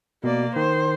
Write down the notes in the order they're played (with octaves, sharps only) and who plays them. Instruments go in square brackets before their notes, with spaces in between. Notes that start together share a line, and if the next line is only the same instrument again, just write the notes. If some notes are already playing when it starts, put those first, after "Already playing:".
[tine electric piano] B2 [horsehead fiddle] A#3 D5
[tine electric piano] D#3 [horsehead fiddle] C5